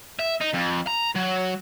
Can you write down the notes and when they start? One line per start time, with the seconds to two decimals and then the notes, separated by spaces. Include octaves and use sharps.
0.19 E5
0.41 D#4
0.54 F2
0.87 A#5
1.15 F#3